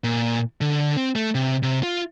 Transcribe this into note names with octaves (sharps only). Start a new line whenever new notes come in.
A#2
D3
C4
A3
C3
C3
F4